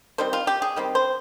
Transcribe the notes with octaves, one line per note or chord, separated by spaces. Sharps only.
D#3 G3 C4 C5
F4
G4
G#4
D#3 G3 C4
C5